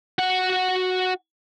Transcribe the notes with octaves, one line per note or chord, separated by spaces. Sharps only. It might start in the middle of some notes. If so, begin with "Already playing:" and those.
F#4 F#5